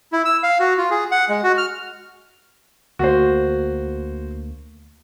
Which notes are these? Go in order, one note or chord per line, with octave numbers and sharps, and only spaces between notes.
E4
E6
F5
F#4
F4
G#4
F#5
G#3
F#4
F6
D2 A#3 F#4 C5